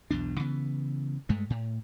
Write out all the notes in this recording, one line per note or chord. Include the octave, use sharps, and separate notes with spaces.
B1 E2 B2 D4
C#3 E3 B3
G2 G#3 A3
A2